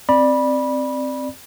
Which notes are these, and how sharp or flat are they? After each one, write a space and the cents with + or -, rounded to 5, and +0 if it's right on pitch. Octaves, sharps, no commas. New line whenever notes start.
C4 +0 D5 +15 B5 -20